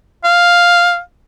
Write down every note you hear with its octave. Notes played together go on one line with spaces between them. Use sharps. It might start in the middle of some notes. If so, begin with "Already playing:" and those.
F5